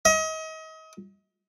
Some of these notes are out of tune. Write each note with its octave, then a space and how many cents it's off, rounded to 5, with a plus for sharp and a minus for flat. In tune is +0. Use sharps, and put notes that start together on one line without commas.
D#5 +35